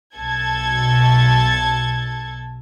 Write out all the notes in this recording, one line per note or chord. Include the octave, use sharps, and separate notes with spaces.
B1 A4 A5 G#6